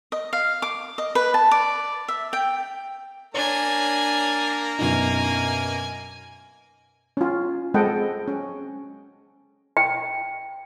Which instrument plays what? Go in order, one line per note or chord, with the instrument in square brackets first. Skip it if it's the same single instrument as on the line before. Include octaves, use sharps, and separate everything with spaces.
[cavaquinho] D#5
F5
D6
D#5
B4
A5
D5
E5
G5
[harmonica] A#3 A#5 [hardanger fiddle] D4 G#5 [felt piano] C#5
[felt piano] F#2 B2 D#4 [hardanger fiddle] G#5
[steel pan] C#4 F4
G#3 C4 A4 D#5 F#5 G5
C#4
[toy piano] G5